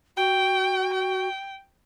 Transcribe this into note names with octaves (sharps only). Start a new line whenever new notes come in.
F#4 G5
G5